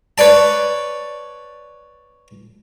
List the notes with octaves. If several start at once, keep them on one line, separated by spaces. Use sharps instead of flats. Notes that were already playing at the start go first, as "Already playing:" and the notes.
B4 C#5 D5 A5